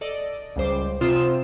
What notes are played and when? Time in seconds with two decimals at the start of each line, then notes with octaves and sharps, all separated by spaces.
0.01 A4 D5 D#5
0.56 C#2 G3 C5 D6
1.01 C3 C4 F4 C5 D#6 E7